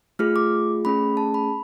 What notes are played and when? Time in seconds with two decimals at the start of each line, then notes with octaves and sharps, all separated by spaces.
0.19 A3 F4 G#4 F6
0.36 D6
0.85 A3 C#4 G#4 B5
1.17 A5
1.34 B5